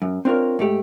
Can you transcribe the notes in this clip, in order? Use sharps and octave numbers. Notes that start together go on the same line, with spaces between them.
F#2
C4 D4 F4 A4 A#4 C#5
G#2 A3 G4